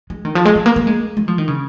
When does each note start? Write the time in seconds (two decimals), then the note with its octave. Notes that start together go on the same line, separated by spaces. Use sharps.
0.10 G#3
0.25 D#3
0.35 F3
0.45 G#3
0.56 G#3
0.66 A#3
0.76 A#3
0.87 G#3
1.17 G#3
1.28 F3
1.38 D#3
1.48 C#3